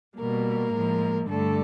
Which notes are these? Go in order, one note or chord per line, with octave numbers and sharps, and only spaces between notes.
B2 G3 A#3 A#4
A2 F3 G#3
G2 D3 G3 A3 A4